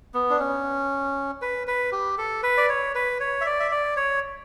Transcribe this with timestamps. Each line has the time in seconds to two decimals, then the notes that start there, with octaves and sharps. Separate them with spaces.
0.14 B3
0.30 D4
0.39 C#4
1.42 B4
1.67 B4
1.92 G4
2.18 A4
2.43 B4
2.57 D5
2.69 C#5
2.95 B4
3.20 C#5
3.41 E5
3.46 D5
3.60 E5
3.71 D5
3.97 C#5